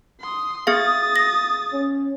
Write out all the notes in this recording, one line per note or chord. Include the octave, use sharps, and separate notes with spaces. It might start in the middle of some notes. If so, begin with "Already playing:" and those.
C6 D#6
B3 G#4 F5 D#6 A6
A#6
C#4